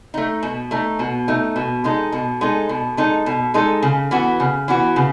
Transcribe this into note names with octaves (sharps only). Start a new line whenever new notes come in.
A3 D#4
B2
A3 D#4
B2
A3 D#4
B2
G#3 D#4 A4
B2
G#3 D#4 A4
B2
G#3 D#4 A4
B2
G#3 D#4 A4
C#3
E3 B3 F#4
C#3
E3 B3 F#4
C#3